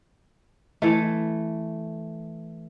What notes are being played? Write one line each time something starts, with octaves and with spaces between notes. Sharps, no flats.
E3 A3